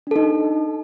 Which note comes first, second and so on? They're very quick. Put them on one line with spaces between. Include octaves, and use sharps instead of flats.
D4 A4 D#4